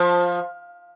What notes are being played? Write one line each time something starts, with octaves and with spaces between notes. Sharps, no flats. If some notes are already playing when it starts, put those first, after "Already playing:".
Already playing: F3